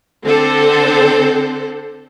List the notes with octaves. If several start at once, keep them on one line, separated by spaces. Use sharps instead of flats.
D3 C4 A4 C5